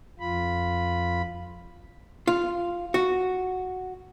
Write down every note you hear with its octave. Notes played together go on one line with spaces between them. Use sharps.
F2 F4 B5
F4
F#4